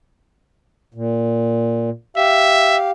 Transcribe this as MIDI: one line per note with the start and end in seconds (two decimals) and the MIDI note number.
0.94 1.90 46
2.17 2.91 67
2.17 2.77 76
2.17 2.91 77